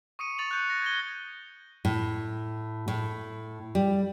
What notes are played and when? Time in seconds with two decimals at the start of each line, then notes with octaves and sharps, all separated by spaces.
0.19 C#6 D#6 C#7 D#7
0.38 C#6 D#6 A6 D#7 F7 F#7
0.51 F#6 G6 C#7
0.70 A#6
0.82 G#6 A#6 D#7 G7
1.85 A2
2.88 A2
3.75 G3